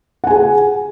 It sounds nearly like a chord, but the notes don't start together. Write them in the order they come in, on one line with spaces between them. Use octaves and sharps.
F#5 G#5 G#4